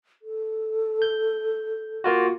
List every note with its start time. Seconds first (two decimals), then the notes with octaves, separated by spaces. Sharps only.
0.22 A4
1.02 G6
2.04 A#3 F4 F#4